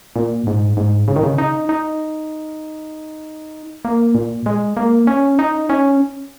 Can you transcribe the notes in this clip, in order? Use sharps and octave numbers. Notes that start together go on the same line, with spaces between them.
A#2
G#2
G#2
C#3
D#3
C#3
D#4
D#4
A#3
A#2
G#3
A#3
C#4
D#4
C#4